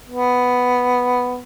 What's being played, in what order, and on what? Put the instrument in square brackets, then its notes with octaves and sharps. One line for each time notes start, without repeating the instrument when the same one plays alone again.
[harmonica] B3